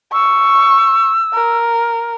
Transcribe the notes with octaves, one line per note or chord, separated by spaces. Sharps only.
C#6 E6
A#4